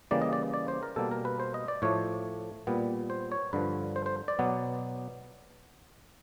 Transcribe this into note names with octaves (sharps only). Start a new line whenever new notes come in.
C#3 E3 G3 A#3 D5
D#5
D5
D5
C5
A#4
B2 G3 A#3 A4
A#4
B4
C5
D#5
D5
A2 F3 A3 C#5
A#2 G3 B3
C5
C#5
G2 D3 F3 B4
C5
C5
D5
B2 F#3 B3